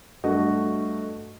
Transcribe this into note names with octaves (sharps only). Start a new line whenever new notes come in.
G2 A3 F#4 D#5